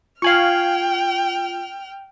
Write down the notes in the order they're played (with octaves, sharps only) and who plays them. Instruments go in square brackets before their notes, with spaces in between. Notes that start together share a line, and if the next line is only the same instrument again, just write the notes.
[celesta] F4 F#7 [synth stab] F5 G#5 C#6 [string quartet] G5 F6